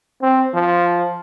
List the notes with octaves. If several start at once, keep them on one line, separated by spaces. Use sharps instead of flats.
C4
F3